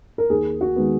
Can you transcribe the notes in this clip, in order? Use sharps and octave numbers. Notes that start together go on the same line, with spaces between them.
A#4
D#2 G#4
F#4
D#3 G#3 B3